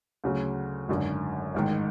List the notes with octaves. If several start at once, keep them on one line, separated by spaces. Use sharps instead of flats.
D2 C#3 F#3
G#1 F#2 D3
A1 G#2 D#3